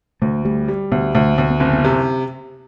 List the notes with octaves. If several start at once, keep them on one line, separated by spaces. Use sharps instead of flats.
D2 A3
G3 A3
G3
D2 B3
D2 A3
D2 B3
B3
F#1 C4
C4
B3
C3